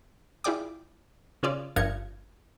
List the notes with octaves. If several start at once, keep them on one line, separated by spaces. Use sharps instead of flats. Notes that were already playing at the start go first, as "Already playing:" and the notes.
E4 F4 G#4 D5 G5 D6
C#3 C#4 F4 G#4 D5
G1 G2 F3 A#4 G#6 C#7